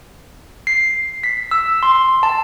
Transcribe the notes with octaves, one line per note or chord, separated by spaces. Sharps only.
C7
B6
E6
C6
A5